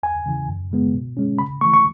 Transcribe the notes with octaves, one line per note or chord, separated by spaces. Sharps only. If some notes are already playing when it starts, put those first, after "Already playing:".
E2 G#5
C#3 E3
F#2
C#3 G#3 B3
B2
G#3 C#4
C#3 B5
E3 A3 C#6
C#6